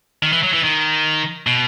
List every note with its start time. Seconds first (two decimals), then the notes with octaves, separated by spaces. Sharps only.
0.23 D#3
0.33 E3
0.43 F#3
0.53 E3
0.64 D#3
1.47 B2